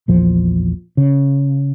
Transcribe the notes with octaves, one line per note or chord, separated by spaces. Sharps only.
A#1 E2 F3
C#3